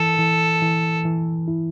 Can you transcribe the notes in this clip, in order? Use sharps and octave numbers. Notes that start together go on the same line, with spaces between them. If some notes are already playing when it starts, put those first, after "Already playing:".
Already playing: E3 A4
E3
E3
E3
E4